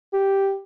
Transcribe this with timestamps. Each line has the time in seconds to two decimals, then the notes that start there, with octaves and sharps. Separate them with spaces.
0.13 G4